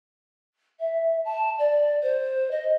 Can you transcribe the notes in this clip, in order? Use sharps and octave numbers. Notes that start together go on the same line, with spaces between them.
E5
A5
D5
C5
D#5